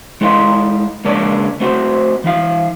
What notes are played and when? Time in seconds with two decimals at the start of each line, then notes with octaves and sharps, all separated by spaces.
0.21 G#3 E4 A4 D#5 F5 C6
1.04 C#2 G#3 A#3 D4 C#5 D5
1.60 A3 C4 F#4 C5
2.24 E3 E4 F5